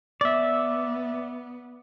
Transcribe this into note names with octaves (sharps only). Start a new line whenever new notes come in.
B3 D5 E5